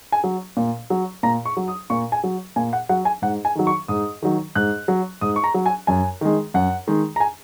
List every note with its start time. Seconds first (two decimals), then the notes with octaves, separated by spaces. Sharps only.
0.12 G#5
0.24 F#3
0.57 A#2
0.90 F#3
1.23 A#2 A#5
1.45 C#6
1.57 F#3
1.68 D#6
1.90 A#2 C#6
2.12 G#5
2.24 F#3
2.56 A#2 G#5
2.73 F#5
2.89 F#3 F#5
3.05 G#5
3.22 G#2 F#5
3.45 G#5
3.55 D#3 F#3
3.67 C#6
3.88 G#2 D#6
4.22 D#3 F#3
4.55 G#2 F#6
4.88 F#3
5.21 G#2 D#6
5.36 C#6
5.44 A#5
5.54 F#3
5.66 G#5
5.87 F#2 G#5
6.21 D#3 G#3
6.54 F#2 F#5
6.88 D#3 G#3
7.16 A#5
7.20 G#5